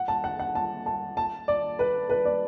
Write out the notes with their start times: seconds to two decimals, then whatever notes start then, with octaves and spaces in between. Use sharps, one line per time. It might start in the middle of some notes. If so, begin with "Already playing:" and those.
Already playing: F#5
0.08 A5
0.24 F#5
0.40 F#5
0.55 A5
0.86 A5
1.17 A5
1.48 D5
1.79 B4
2.09 B4
2.25 D5